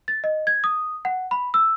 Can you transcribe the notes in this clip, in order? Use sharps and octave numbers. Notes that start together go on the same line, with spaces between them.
A6
D#5
G#6
D#6
F#5
B5
E6